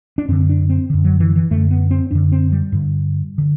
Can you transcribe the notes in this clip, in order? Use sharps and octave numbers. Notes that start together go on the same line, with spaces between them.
D4
F#2 D3 C4
D4
C4
F#2 D3
F#3
E3
E3
F#2 D3 A3
B3
C4
F#2 D3 D4
C4
G3
G2 D3
D3